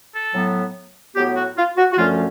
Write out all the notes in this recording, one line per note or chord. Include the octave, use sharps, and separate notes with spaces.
A4
A2 F#3 B3
A2 F#3 B3 G4
F#4
F4
F#4
F#4
F#2 D3 F3 A3 C#4 F4